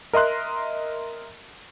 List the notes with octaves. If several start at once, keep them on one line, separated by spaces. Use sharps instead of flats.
A#4 D#5 E5 C6 F#6